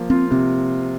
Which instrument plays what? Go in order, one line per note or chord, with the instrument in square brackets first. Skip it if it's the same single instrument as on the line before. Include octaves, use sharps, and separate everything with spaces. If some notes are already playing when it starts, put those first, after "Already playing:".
Already playing: [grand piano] F3 A#3
[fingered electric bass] C4 [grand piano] F4
[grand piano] C3 [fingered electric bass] C4